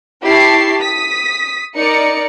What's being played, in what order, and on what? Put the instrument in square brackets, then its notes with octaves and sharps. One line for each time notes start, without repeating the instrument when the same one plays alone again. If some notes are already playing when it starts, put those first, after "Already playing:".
[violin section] E4 G4 A5 C#6 C7
D#6 B6
D#4 A#4 D5 C#7